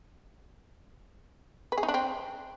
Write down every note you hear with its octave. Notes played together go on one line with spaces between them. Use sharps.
B4
G#4
D#4
D4
C4